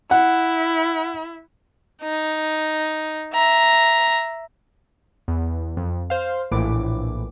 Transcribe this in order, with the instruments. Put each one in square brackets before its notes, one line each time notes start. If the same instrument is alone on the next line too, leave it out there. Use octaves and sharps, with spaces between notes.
[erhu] E4 [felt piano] F#5
[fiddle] D#4
E5 A#5
[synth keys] E2
F2
C5 F5
A#1 A2 E3 D6